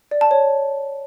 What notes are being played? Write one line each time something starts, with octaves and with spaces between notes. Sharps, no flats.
D5
A5
C#5